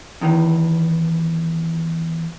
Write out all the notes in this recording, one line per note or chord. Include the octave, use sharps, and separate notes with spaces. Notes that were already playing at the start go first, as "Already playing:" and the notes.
E2 D#3 E3